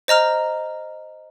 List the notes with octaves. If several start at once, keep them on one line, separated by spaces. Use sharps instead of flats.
C5 D#5 A#5 F6